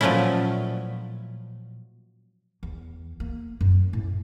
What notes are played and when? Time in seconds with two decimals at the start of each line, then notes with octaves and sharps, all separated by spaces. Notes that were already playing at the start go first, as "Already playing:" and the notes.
0.01 A#2 F3 F#3 A3 C#4 E4
2.63 E2
3.20 A#3
3.61 F#2
3.93 A2